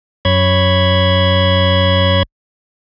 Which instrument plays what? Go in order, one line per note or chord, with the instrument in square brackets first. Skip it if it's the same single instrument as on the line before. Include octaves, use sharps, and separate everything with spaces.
[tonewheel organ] F#2 C#5 B5 G#6